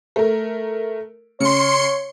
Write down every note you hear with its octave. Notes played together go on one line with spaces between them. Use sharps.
A3 A#4
C#3 C#5 C6 C#7